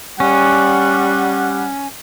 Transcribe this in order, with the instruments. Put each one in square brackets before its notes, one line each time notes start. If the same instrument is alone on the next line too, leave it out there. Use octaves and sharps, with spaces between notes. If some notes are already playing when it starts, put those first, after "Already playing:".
[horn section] G3 F#5 [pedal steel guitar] C#4